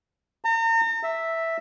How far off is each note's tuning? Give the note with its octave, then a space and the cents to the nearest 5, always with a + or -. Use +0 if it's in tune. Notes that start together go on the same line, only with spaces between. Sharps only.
A#5 -40
E5 -5